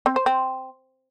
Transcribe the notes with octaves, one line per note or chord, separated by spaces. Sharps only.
C4
C5
C4